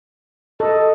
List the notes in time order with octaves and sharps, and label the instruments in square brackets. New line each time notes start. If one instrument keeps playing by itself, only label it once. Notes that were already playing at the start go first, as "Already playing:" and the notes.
[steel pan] A4 [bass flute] D#5